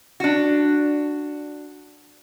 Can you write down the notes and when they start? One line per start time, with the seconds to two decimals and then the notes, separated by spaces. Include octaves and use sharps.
0.20 D4 F#4